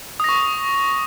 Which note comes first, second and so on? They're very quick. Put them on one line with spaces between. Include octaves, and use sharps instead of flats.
D#6 A#6 C#6